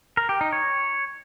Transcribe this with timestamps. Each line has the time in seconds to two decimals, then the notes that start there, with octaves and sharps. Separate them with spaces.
0.17 A#4
0.29 G4
0.41 D#4
0.53 C#5